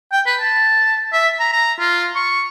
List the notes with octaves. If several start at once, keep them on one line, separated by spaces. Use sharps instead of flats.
G5
B4
A5
E5
A#5
A#5
F4
C#6